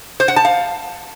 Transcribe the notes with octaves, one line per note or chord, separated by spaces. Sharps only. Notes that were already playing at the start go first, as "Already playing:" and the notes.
C5
F#5
A5
F5